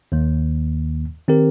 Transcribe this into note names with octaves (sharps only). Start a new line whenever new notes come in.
D#2 D#3 A#3
D#3 C4 G4 A#4